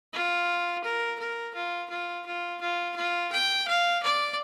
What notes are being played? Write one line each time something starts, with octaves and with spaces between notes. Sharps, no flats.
F4
A#4
A#4
F4
F4
F4
F4
F4
G5
F5
D5